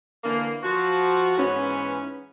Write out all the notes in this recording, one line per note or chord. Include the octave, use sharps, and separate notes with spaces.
D3 E3 A#3
F3 F#4
G#2 E3 B3 C#4